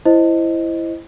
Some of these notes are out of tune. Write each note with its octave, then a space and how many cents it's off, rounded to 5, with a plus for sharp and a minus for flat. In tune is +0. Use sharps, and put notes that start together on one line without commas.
E4 +10 C5 +0 D#5 +0